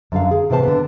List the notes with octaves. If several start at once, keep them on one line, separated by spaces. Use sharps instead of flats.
F#2 D3 F5
G#4
A2 C3 E3 C5 A5
D3 B3